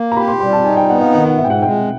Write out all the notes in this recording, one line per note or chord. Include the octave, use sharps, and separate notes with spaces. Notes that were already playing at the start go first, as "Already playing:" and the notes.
Already playing: A#3
A#5
G4 B5
C6
G3 C6
A5
D#4 G#5
G5
B3 F#5
F5
D#3 F#5
F#5
G#2 E5
G5
F#5
G#3 G5